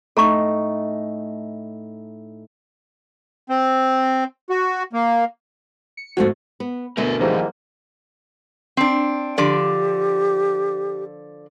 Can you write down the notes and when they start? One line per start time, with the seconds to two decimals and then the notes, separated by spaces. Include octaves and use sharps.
0.17 A2 D#4 A4 A#5 C#6
3.50 C4
4.50 F#4
4.93 A#3
5.97 C#7
6.17 F2 G#2 A3 F#4
6.60 B3
6.97 D2 B2 D3 A#4 G#5
7.20 D#2 G#2 E3 F3 G3 A#3
8.77 C4 D4
9.38 D3 F3 G4 D5